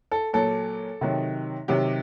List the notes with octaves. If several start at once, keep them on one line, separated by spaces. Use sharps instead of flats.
A4
A#2 F#3 A4
C3 D#3 F#3
C3 D#3 F#3 G4